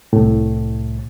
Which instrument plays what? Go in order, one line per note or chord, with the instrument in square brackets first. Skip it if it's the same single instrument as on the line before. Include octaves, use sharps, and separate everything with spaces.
[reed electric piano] C2 A2